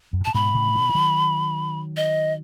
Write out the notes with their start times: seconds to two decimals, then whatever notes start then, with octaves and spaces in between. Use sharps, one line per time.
0.13 F#2
0.20 G#2
0.25 A2 A5
0.34 G#2 B2 B5
0.54 A2 C#3
0.67 E3
0.75 B2 D#3
0.89 E3
0.95 D#3 F#3
1.97 D#5